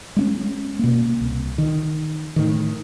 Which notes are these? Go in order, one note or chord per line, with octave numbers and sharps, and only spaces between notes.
G#3 C4 C#4
B2 A#3
C2
D#3
A2 D#3